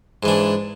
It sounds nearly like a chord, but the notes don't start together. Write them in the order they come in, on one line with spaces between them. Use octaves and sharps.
G#2 E3 D4